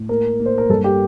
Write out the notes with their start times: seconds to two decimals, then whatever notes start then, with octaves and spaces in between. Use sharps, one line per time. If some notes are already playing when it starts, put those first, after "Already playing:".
Already playing: A2
0.09 A#3 A#4
0.40 A#3
0.46 C5
0.58 A#4
0.69 G2 A4
0.84 G4